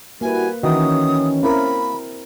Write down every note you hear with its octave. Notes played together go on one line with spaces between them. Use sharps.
G3 A#3 E4 F#4 B4 G#5
D#3 E3 C#4 F#4 D#6
A#3 C4 E4 A#4 B5